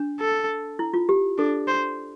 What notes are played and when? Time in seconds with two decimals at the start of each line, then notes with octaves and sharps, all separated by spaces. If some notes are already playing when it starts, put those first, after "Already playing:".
Already playing: D4
0.20 A4
0.79 E4
0.94 F4
1.09 G4
1.38 D4 A4
1.68 C5